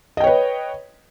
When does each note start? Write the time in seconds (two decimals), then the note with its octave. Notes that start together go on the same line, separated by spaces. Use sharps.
0.17 D#5
0.20 G5
0.24 C#5
0.27 B4